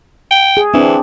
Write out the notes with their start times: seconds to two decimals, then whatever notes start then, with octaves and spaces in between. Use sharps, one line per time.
0.31 G5
0.57 G#4
0.74 E3 C4 D4